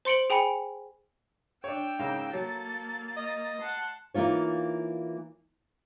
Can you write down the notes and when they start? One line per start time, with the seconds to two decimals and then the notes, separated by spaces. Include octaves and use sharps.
0.05 C5 C6 C#7 D7 F#7
0.30 G#4 G5 G#5 B5 C#7
1.64 D4 C#5 G5 E6
1.99 G#2 C#3 A#3
2.33 F#3 A#3 A4 A6
3.16 D#5
3.59 F#5 A5 C6
4.14 E3 A#3 D#4 F4 C#5